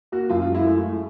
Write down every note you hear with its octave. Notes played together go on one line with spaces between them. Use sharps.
A#3 F#4
F#2 F4
F4
G#3
E4
A3